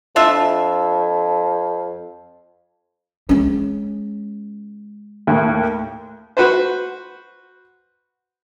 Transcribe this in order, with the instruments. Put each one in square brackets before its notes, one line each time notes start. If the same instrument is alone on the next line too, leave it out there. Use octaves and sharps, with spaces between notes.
[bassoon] F2 [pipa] D4 F4 E5
[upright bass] G#3 C#4
[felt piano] D#2 A2
[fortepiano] F#4 B4 C5